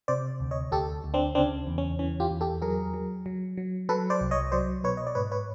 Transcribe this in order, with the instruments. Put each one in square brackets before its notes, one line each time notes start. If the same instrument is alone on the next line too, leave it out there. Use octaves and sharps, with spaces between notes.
[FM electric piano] C3 C5 D5
D2
C#5 D#5
D2 G4 A4
D2
C4 D4
C#3 C4 D4
E2
C#4
E3 C#4
F4 G4
E2
G4 A4
F#3 G#4 A#4
F#3
F#3
F#3
F#3 A4 B4
C5 D5
C2
C#5 D#5
F#3 C5 D5
B2 B4 C#5
D#5
D5
G#2 B4 C#5
B4 C#5